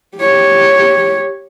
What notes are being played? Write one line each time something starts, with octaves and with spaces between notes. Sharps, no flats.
G4 C#5